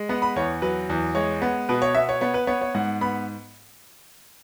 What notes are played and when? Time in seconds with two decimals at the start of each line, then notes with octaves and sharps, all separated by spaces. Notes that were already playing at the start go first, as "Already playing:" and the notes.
Already playing: G#3
0.09 B3 F#5
0.22 B5
0.36 E2 C#5
0.62 F#3 B4
0.90 E2
1.15 G#3 C#5
1.42 B3
1.69 B2 B4
1.82 C#5
1.95 B3 E5
2.09 C#5
2.21 B3 C#5
2.34 B4
2.47 B3 C#5
2.61 C#5
2.74 G#2 F#5
3.01 B3 B5